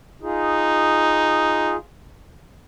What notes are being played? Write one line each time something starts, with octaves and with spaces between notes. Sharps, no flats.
D#4 F4 G#4